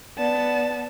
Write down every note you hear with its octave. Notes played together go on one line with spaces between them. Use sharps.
B3 D5 A5